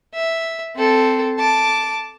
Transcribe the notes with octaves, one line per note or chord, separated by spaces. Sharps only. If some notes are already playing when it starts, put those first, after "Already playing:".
E5
C4 A4
A5 D6